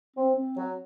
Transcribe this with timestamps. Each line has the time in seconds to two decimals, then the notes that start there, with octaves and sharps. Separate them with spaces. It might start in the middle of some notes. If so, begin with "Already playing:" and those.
0.17 C4
0.36 C4
0.56 F#3